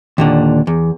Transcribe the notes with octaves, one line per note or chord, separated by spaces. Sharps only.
D#2 A#2 D3
E2